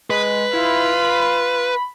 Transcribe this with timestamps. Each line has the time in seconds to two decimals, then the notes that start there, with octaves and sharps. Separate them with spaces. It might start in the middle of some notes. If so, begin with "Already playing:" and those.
0.10 G#3 B4
0.53 E4 F4
1.04 B5